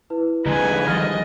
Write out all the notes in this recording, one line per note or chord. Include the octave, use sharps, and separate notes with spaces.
E4 B4
F2 G#2 D3 G#3 B4 G#5 A#5
D#3 F3 G3 D#5 F6 A6